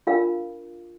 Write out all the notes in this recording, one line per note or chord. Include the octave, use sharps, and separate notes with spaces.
D4 F4 A#4 F5